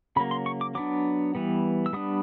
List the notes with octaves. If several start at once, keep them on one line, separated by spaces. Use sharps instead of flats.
C#3 F#3 A#3 B5
C6
C#6
D6
F#3 B3 D4 D6
E3 G3 B3
E6
G3 B3 D4 D#6